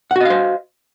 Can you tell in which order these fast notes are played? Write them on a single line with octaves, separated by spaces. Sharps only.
F#5 F#4 D#5 F5 C5